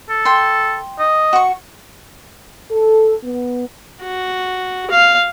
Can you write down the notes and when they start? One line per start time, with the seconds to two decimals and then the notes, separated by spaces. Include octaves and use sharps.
0.10 A4
0.25 G5 C6
1.00 D#5
1.33 F#4 C#6
2.71 A4
3.24 B3
4.02 F#4
4.91 F5